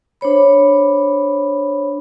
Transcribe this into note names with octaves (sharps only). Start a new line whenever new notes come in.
D4 C5 C#5 B5